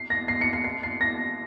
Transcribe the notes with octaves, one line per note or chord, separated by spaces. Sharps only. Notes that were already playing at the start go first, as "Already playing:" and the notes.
Already playing: C7
A#6
C7
C#7
C7
C7
C7
A#6